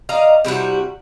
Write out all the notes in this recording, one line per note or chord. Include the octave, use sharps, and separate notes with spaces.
D5 D#5 F5 A#5
C3 G3 E4 F#4